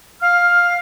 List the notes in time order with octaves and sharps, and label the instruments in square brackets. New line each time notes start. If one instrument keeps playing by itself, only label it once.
[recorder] F5 [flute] F6